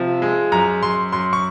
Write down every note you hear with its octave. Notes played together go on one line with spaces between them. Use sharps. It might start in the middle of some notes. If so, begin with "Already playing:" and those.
Already playing: C3 F3
G#3
F#2 A#5
F#2 C6
F#2 C6
C#6